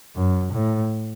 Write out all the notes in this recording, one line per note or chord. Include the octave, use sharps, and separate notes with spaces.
F#2
A2